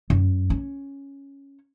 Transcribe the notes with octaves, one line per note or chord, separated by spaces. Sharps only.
F#2
C#4